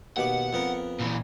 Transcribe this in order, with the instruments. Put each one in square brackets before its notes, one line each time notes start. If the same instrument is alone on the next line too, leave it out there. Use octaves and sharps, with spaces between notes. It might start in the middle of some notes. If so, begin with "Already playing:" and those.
[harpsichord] D#2 B2 D6 [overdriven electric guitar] F#5
[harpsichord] F2 B3 A#4
[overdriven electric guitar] A#2 E3